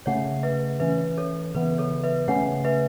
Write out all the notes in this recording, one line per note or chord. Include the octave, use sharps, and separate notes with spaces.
C#3 A3 C#4 C#5 F#5
B4 E5
E3 C#4 B4 E5
A4 C#5
C#3 E3 B3 B4
A4 C#5
B4 E5
C#3 A3 C#4 C#5 F#5
B4 E5